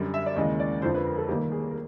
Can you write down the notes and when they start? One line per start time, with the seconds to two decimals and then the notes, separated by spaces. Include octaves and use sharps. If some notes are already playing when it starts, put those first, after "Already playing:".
Already playing: F#2 D3 G3
0.14 E5
0.26 D5
0.36 D#2 C#3 E3 G#3 D#5
0.60 D5
0.82 F2 D3 F3 C5
0.94 B4
1.06 A#4
1.18 A4
1.28 F1 D#2 D#3 G3 A#3 G4
1.52 G#4
1.71 A#4